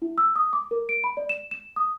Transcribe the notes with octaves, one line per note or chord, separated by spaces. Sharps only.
E4
E6
D#6
D6
A#4
D7
B5
D5
E7
E7
D#6